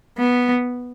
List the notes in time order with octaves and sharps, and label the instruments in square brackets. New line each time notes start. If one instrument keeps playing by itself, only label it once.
[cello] B3